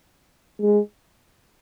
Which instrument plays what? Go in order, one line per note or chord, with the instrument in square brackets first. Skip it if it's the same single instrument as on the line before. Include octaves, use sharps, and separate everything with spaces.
[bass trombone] G#3